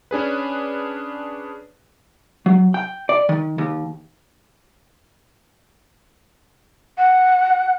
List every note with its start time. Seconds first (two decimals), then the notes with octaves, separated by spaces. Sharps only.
0.11 C#4 D4 G#4 B4
2.46 F#3
2.74 G5
3.09 D5
3.29 D#3
3.58 D#2
6.98 F#5